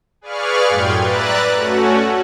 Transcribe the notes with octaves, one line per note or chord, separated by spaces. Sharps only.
G#4 B4 D5 F5 C#6 F6
F#2 A2 G3 G5 C6 G#6
B4 D5 E5 A#5 F#6 A6
A3 C#4 F#4